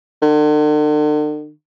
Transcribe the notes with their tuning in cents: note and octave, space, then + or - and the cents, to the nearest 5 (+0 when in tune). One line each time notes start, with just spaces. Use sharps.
D3 +45